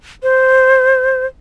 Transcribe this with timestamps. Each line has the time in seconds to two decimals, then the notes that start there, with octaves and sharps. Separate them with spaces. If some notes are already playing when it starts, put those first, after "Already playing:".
0.23 C5